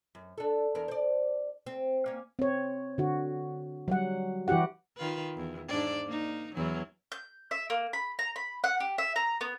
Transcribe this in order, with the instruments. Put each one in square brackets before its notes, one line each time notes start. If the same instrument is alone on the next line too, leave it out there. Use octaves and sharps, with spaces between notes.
[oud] F#2
D4 A4
E2 D4 A#4
C5 D5
C4
A#3 C#4
[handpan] C4 C#5
D3 F#4
F#3 G3 F#5
E3 E4 F#4 G4 F#5
[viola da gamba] D#3 F4 B4
E2
G#2 D4 D5
A#3 D#4
E2 E3 F#3
[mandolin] G6
E5
A#3
B5
A#5
B5
F#5
G4
E5
A#5
B3